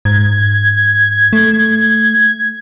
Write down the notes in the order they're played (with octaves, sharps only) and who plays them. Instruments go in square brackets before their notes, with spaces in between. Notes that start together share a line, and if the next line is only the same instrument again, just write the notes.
[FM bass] G#2 [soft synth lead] G#6
[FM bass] A3